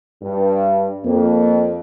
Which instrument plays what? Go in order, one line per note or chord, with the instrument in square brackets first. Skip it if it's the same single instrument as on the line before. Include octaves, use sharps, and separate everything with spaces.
[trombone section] G2
[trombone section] F2 [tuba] A#3